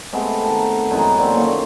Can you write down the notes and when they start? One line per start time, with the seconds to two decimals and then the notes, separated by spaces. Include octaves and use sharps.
0.13 C3 G#3 A3 B3
0.44 D#3 A5
0.91 F#2 E3 G#3 D#4
1.18 D3 A#3 C4
1.37 A#2 D#3 C#5 F5